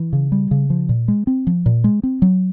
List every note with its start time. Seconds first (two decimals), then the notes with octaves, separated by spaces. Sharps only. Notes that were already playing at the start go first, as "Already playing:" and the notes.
Already playing: E3
0.13 C#3
0.32 G3
0.51 C#3
0.70 F3
0.89 A#2
1.08 G#3
1.27 C4
1.47 F3
1.66 A#2
1.84 G#3
2.03 C4
2.22 F#3